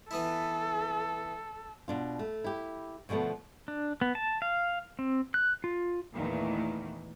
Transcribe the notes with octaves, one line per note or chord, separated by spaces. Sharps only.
E3 B3 E4 A4
B2 D4 F4
A3
E4 G4
B2 D3 F3 A3 B3
D4
B3
A5
F5
C4
F#6
F4
E2 A#2 D#3 E3 A3